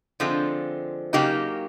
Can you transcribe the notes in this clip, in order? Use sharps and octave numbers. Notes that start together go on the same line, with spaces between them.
D3 F3 G#3 C4 F4
C#3 F#3 A#3 D#4 G4